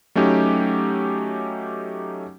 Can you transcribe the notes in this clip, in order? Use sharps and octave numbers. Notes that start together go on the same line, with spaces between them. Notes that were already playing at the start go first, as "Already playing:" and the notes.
F#3 A3 C#4 D#4 G4